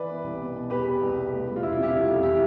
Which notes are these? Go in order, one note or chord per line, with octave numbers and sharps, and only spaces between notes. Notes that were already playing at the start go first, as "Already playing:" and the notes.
Already playing: E3 B4 D5
B3
C2
B2
B2
E2 G4 B4
E2
C2
B2
A2
G3
F4
E1 E4
F4
C3
E4 G4
F1
F2
E3 E4 G4